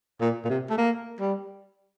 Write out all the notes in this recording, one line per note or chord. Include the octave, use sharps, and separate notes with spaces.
A#2
A#2
C3
A3
A#3
G3